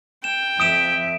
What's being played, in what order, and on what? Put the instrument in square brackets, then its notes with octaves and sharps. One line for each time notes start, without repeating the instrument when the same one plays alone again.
[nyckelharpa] G5 [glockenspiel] E7
[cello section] F2 E5 [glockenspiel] D#6 D7 E7